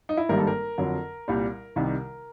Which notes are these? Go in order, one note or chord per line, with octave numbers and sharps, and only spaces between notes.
D#4
E4
G#1 G2 D#3 G3 A#3 A#4
A4
A#4
F2 D3 F#3
C2 A#2 G3
C2 C3 D#3 G3